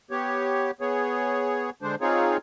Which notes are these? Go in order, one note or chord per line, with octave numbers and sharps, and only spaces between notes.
B3 G4 C#5
B3 G#4 C#5
D3 G#3 D4 C5
C4 D#4 F4 G#4 C#5